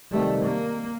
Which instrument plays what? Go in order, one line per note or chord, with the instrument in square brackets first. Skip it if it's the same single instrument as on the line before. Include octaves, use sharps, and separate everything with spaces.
[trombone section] C3 D#3 G3 [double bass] A3
[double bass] A#3